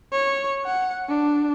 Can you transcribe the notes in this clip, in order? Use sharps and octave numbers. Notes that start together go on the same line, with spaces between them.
C#5
F#5
D4